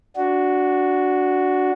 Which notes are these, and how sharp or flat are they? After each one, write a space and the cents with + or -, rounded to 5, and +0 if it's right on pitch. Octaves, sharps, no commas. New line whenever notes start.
D4 -10 F#4 +0